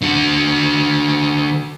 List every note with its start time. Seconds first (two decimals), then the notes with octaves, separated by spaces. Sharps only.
0.02 D3 F#4